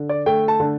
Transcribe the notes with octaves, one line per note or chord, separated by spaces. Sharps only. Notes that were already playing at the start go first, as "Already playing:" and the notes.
Already playing: D3
D5
A3 G5
A5
D3